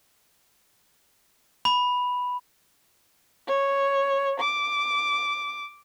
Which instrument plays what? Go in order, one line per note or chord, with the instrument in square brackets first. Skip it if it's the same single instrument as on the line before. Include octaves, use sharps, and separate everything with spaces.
[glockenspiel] B5
[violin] C#5
D6